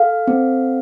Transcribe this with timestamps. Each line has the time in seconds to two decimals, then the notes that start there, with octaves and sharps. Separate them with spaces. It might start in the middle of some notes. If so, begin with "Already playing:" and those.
Already playing: A4 F5
0.28 C4